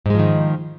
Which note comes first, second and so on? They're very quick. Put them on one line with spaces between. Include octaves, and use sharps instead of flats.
G#2 G#3 F3 D#3